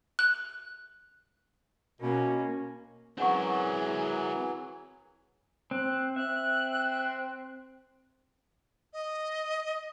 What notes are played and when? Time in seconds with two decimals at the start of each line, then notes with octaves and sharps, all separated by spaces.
0.19 F#6
2.01 B2 A#3 C#4
3.18 E3 F#3 C4 C#4 G#4 A#4 F#5 C#6
5.71 C4 F#6
6.16 C4 E5 F#6
8.93 D#5